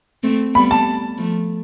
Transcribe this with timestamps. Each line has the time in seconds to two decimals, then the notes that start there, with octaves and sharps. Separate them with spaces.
0.23 A3 C4
0.55 G3 B3 B5
0.71 A5
1.18 F3 A3